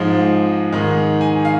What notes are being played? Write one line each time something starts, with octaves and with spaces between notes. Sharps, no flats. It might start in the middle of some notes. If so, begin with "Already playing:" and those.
Already playing: G#2 F3 G#3
G#2 D#3 G#3
G#5
F5